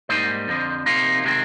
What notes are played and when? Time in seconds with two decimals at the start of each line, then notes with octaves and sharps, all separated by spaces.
0.09 G#2 G3 A#3 D#4 C5 D#5
0.48 F2 D3 F3
0.86 C3 F3 A#3 D#4 F4
1.24 C3 D#3 G#3 C4